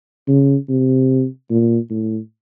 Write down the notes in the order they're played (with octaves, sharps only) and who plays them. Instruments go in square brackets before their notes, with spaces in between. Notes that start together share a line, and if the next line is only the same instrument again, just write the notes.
[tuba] C#3
C3
A#2
A2